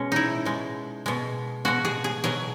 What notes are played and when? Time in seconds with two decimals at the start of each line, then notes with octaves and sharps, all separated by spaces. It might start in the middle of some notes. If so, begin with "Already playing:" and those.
Already playing: B2 G#3 C#4
0.12 D#4 E4
0.45 B2 G#3
1.06 B2 G#3
1.65 B2 G#3 F#4
1.85 G#4
2.04 G#4
2.24 B2 F#3 G#4